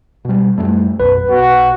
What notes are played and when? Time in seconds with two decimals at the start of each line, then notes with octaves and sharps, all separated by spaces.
0.25 B2 G3
0.58 F#2 G3 A3
1.00 B1 F#2 B4
1.28 B1 F#4